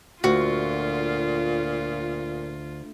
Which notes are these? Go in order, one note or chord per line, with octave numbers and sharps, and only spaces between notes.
D2 A#2 F4 F#4